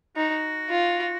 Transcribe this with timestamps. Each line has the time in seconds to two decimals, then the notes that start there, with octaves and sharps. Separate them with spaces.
0.16 D#4 F#4
0.70 F4